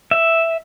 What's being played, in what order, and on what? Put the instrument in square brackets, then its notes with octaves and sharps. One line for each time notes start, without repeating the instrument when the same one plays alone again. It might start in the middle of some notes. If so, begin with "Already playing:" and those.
[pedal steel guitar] E5